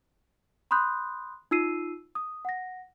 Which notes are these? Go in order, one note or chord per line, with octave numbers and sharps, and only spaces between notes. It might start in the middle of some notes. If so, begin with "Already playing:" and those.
B5 C6 D#6 F#6 G6
D#4 F4 E6 C7 D#7
D#6
F#5 A#6